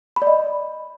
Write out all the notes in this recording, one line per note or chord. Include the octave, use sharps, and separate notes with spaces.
B5
D5
D#5